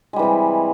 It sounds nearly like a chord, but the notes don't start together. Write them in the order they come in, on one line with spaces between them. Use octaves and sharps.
G#3 G3 E3 C3